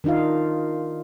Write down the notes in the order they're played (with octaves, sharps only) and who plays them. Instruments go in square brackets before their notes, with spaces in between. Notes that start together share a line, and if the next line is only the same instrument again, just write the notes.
[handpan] D#3 D4 D#4 F4 F5